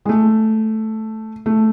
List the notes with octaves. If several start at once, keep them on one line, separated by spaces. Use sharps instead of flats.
G#3
A3
A3